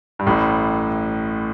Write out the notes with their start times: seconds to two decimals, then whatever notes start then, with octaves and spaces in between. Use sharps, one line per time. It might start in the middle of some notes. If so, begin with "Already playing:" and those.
0.19 G2
0.26 A1 A2